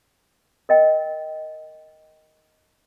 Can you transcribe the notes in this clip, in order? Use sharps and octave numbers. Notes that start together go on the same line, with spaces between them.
A#4 D#5 G5